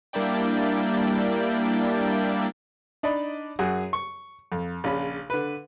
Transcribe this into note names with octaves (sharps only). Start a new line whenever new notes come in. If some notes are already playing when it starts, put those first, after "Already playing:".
G3 A#3 D4 E4 D5 G5
D4 D#4 D5 D#5 B5
F#2 F#4 G#4
C#6
F2
A#1 C#3 B5
D3 B4